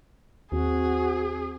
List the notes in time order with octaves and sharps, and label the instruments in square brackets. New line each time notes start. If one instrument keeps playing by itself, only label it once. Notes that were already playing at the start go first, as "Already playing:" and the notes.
[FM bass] D#2 [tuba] C4 [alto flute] F#4 [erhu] G#4